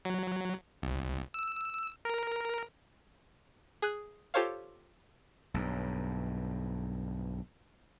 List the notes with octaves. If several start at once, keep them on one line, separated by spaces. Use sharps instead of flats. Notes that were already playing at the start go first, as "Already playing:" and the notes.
F#3
C2
E6
A#4
G#4 F#6
F4 G4 A4 C5 C#5 F5
B1 G2